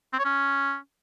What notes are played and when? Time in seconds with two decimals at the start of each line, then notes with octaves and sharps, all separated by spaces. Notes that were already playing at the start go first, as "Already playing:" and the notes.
0.13 C4
0.19 C#5
0.25 C#4